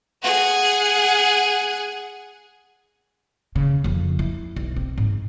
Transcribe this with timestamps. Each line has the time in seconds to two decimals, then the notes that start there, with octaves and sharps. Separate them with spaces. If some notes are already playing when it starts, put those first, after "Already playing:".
0.22 G#4 F#5
3.56 C#3
3.84 F2 C#3
4.19 E4
4.56 B1
4.76 C4
4.98 G#2